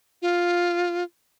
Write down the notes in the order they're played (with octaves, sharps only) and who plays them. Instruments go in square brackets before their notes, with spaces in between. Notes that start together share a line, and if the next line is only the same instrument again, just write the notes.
[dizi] F4